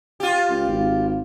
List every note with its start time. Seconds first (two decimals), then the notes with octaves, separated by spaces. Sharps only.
0.20 F4 G4
0.49 C#2
0.68 G#1